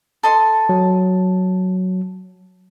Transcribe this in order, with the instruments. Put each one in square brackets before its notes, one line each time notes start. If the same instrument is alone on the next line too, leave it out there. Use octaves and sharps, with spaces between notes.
[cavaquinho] A4 D#5 C6
[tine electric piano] F#3